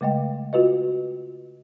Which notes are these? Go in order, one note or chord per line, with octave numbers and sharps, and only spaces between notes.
C#3 G#3 A3 D#5 G5
F4 F#4 B4 D#5